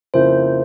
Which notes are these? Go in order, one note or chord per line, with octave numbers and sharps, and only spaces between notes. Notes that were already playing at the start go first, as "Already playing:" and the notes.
F2 C#3 F3 A#3 E4 C5